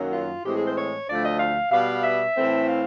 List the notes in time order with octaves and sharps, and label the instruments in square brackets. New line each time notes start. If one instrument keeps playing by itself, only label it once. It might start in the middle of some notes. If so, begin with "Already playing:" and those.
Already playing: [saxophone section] F#2 D#3 F#3 A#3
F4
A2 E3 G#3 C4 G4
G#4
C5
C#5
D2 D3 F3 A3 D5
D#5
F5
B2 G3 B3 F5
E5
A2 E3 A3 C4
F5